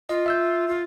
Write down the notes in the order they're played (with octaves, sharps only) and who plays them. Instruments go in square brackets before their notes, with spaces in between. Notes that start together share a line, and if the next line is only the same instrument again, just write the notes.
[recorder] F4 [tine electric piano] D#5
[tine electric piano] E5 E6 G6
[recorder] F4